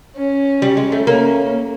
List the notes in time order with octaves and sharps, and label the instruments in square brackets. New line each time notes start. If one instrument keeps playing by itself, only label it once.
[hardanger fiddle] C#4
[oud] G3
G#3
A3
[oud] A#3 [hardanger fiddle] C#4